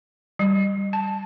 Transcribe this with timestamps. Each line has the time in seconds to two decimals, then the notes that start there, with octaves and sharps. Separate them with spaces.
0.39 G3
0.93 A5